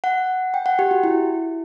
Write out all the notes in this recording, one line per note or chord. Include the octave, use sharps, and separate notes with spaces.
F#5
G5
F#5
G4
F#4
E4